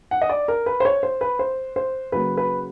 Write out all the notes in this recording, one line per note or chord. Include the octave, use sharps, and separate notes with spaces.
F#5
D#5
D5
A#4
B4
C5
C#5
C5
B4
C5
C5
C#3 F#3 A#3 B4
B4